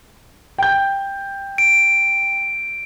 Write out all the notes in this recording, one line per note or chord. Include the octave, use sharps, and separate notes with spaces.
G5 G6
D7